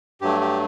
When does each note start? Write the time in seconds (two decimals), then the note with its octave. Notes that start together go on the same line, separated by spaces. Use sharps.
0.21 G2 F#3 A3 G4
0.41 G4